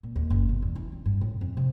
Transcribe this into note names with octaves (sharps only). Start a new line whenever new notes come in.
A#2
D#2
F#1
B2
E2
E4
C4
G2
A2
F2
C3